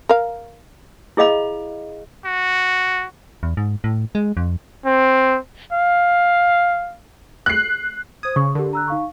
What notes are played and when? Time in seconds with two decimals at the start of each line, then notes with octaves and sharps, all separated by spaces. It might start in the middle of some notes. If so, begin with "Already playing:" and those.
0.09 A#4 F5
1.17 E4 G#4 D#5 F5 B5
2.24 F#4
3.43 E2
3.57 G#2
3.84 A2
4.15 G#3
4.37 F2
4.85 C4
5.72 F5
7.46 F#6 C7
8.23 C5 D#6 G#6
8.36 C#3 C#6 D#6
8.55 D3 G4 A#4
8.73 A#5 E6 F#6
8.87 D#4 F5 C#6